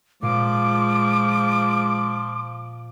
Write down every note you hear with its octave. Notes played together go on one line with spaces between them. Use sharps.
A#2 F3 G#3 F5 D6 D#7